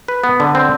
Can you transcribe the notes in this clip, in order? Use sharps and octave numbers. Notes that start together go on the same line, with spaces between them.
B4
B3
D3
C4